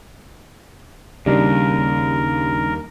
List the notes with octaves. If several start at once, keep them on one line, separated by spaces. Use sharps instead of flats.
D#2 C#3 G3 D4 D#4 A#4